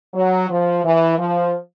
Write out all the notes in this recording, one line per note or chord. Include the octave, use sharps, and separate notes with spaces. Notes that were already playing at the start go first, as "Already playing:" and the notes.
F#3
F3
E3
F3